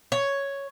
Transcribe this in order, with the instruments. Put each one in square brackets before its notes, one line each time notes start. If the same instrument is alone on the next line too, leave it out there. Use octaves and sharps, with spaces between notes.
[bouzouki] C#5